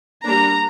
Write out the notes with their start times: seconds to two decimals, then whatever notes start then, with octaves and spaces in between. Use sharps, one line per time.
0.24 G3 A#3 D4 A#5